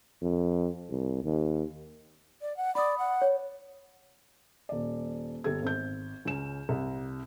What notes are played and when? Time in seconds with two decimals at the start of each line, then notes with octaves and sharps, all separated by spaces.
0.22 F2
0.90 C2
1.23 D#2
2.41 D5
2.57 F#5
2.75 D5 B5 D#6
2.98 F#5
3.21 C#5
4.69 D#1 D5
5.44 G1 G4 A4 G#6
5.62 G#1 G6
6.25 C#2 C#4 E7
6.69 C2